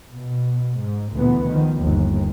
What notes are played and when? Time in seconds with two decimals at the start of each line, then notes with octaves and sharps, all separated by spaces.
0.13 B2
0.79 G#2
1.13 D2 A#2 E3 B3
1.48 D#3 F3
1.83 G1 D#2